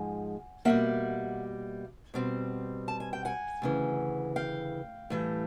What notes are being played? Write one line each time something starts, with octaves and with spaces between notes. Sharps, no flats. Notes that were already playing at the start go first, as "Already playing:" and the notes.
Already playing: G#2 F3 G#3 F#5 G#5
B2 G3 A#3 E5 F#5
B2 G3 C4
A5
G#5
G5
F#5 G#5
D2 C#3 E3
F5 G5
A2 E3 G3